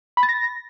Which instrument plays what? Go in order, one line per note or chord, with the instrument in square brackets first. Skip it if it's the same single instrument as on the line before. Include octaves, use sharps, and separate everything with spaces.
[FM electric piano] B5
A6
A#6